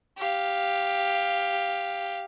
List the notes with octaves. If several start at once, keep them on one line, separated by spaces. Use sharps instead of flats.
G4 F5